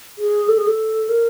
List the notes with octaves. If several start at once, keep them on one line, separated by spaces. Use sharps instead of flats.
G#4
A4
G#4
A4
A#4